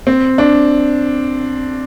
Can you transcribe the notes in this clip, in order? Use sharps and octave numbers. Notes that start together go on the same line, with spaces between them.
C4
D4